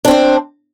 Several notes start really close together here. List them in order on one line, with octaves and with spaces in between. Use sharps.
D4 C4 C5